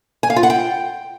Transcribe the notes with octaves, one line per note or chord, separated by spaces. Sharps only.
G#5
F5
F4
F#5
G5